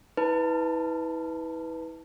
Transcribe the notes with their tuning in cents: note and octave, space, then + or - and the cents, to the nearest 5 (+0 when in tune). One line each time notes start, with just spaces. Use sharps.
E4 -35 B4 +0 A5 -5